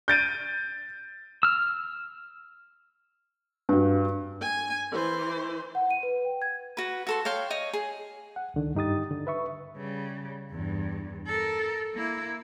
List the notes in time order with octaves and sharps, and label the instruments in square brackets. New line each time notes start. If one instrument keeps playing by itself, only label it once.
[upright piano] G6 A6 D7 D#7
[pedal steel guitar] E6 F6
[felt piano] G2 F#4
[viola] G#5
E3 C5
[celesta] F#5
D#7
B4
G5
G#6
[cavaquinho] F#4 B4
F#4 A4 C6
C#5 F5 G5 C6
C#5 D#5
G#4
[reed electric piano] F#5
C#2 D3 D#3
G2 D#4 G4 D#6 A6
D3
B4 E5 C#6
[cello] C#3 G3
E2 G2
A4 A#4
A#3 E4